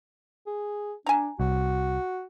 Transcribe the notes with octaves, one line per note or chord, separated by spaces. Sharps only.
G#4
D4 G#5 A#5
C2 F#4